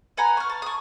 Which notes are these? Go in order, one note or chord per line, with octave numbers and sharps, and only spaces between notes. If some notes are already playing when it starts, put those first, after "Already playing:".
B4 F#5 G#5 A#5
C#6 F6
A5
C#6 D#6